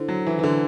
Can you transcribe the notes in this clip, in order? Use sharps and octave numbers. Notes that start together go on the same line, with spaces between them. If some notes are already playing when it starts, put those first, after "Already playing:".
Already playing: D3 E4 A4 C5
F#3
E3
E3
D3